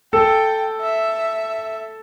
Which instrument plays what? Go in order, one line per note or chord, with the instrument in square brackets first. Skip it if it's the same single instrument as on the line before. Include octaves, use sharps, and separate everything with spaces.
[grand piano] A4 [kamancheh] G5
[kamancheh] E5